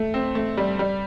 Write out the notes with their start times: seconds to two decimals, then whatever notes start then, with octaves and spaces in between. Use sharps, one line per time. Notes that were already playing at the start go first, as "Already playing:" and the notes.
Already playing: A3
0.14 C4
0.35 A3
0.57 G3
0.79 G3